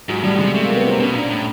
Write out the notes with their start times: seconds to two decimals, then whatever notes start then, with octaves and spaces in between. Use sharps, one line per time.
0.09 G#2 F#3
0.23 A2 G3
0.39 C3 G#3
0.53 C3 A3
0.65 A#3
0.76 B3
0.87 C4
0.99 B2 C#4
1.14 A#2 D4
1.30 A2